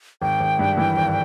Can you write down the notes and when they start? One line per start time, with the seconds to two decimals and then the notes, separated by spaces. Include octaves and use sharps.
0.22 G#1 G5
0.40 G#1
0.59 G2
0.77 E3
0.97 G#1